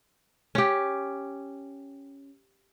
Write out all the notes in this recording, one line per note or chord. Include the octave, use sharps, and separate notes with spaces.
C#4 G4